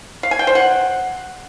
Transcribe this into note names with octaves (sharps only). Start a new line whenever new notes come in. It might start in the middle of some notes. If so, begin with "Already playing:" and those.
F5
G#5
G5
C5
F#5